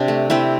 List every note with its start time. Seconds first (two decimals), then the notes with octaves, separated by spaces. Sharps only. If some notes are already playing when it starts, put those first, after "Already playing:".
Already playing: C3 D4
0.08 A3
0.30 C3 C4 E4